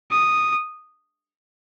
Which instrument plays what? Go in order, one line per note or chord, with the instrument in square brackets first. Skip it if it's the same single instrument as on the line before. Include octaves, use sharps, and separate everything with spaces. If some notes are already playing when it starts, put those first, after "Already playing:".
[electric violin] D#6